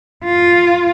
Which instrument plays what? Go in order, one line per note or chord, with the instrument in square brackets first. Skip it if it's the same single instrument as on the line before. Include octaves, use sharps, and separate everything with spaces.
[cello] F4